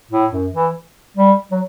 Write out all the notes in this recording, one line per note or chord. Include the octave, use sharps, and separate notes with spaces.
A2
F#2
E3
G3
F#3